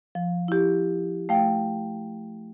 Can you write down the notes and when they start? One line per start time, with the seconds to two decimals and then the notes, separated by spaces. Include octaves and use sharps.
0.15 F3
0.48 E4 G4
1.29 A3 F5 G5